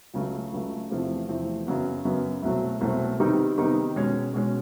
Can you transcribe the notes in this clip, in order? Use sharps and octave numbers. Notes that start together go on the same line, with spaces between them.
C#2 C#3 F#3 A3
C#2 C#3 F#3 A3
E2 C3 F3 A3 C4
E2 C3 F3 A3 C4
F#2 C#3 F#3 B3
F#2 C#3 F#3 B3
C2 B2 F#3 A3 C4
C2 B2 F#3 A3 C4
C3 D#3 G3 B3 D#4
C3 D#3 G3 B3 D#4
B2 G#3 C#4
B2 G#3 C#4